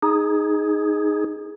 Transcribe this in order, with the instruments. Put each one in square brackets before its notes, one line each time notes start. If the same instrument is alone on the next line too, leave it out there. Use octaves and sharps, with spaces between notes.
[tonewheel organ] D#4 G#4